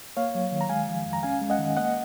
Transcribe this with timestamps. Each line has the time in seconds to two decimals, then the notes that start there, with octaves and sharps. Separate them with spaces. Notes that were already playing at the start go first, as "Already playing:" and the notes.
0.17 A#3 C#5 F5
0.35 F#3
0.52 D#3
0.61 A#5
0.69 G#3 F5 G#5
0.88 F3
1.06 F2
1.13 A#5
1.23 C#4 F5 G#5
1.42 G#3
1.50 D#5 F#5
1.59 D#3
1.77 A#3 D#5 F#5